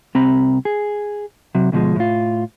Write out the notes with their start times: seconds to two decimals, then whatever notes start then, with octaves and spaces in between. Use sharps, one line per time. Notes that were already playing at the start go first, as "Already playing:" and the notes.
0.15 C2 C4 A#5 B5
0.65 G#4
1.55 C3 F#3
1.72 D2 B2 F3 G#3
1.96 A2 F4